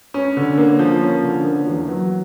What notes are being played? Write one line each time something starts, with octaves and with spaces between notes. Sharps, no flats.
C#4
D3
A#3
F3
C#4
D3
A#3
E2
F#3